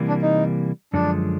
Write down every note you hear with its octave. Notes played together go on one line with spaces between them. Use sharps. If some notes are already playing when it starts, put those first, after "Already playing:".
Already playing: C3 E3 G3 A#3
D4
D#4
F#2 D3 F3 G#3 D4